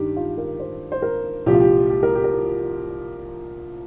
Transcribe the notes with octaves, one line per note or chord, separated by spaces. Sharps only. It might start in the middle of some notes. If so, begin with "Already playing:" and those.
Already playing: G2 D#3 G4
F4
A#4
C5
C5
A#4
C2 A#2 F3 G4
F4
G4
G4
A#4
G4
A#4